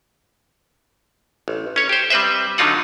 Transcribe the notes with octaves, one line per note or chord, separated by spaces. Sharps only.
A1
C#4 C#5
G4 C5
G3 C4 B4 C5 E5
D3 F#3 D#4 F4 F#5